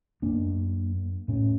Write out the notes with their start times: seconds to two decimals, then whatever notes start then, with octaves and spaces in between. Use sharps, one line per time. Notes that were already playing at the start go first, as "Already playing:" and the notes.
0.22 F#2 A#3 D4
1.28 A2 C#4